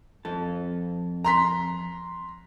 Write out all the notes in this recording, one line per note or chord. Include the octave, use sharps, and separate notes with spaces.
F2 A4
A#5 C6 B6